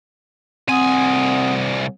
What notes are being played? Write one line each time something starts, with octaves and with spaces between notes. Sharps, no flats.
C2 C4 F#5 G#5 D#6